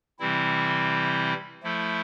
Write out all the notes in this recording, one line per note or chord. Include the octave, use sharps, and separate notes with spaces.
C3 E3 G3 C4 E4
F3 A3 E4 A4